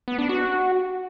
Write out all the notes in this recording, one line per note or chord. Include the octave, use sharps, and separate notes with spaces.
B3
D4
F#4